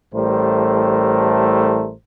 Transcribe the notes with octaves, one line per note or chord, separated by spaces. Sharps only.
A1 A2 G3 A3 A#4 C5